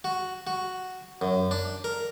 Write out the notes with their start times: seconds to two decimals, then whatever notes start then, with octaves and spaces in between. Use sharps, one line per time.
0.04 F#4
0.47 F#4
1.21 F#2
1.51 D4
1.84 A#4